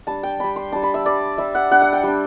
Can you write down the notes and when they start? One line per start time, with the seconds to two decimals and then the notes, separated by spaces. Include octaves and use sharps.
0.07 G3 D4 A5
0.23 G5
0.39 G3 D4 B5
0.56 C6
0.72 G3 D4 A5
0.83 B5
0.94 E5
1.05 G3 D4 D5
1.38 G3 D4 E5
1.55 F#5
1.71 G3 D4 F#5
1.82 F#5
1.93 G5
2.03 G3 D4